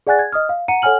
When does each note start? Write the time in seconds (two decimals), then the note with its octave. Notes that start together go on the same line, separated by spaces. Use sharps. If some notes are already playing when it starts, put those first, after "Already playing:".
0.07 G#4 D5 F#5 G#5 F#6 A6
0.19 G#6
0.32 D#5 D#6 F6
0.49 F5
0.68 F#5 A#5 C#7 D#7
0.82 A4 C#5 F#5 G#5 F6 F#7